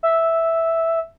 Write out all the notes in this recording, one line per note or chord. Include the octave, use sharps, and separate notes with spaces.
E5